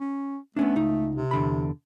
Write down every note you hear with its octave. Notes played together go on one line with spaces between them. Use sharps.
C#4
A3 B3 C#4 D4
C#2 D#4
C3
E2 D3 B5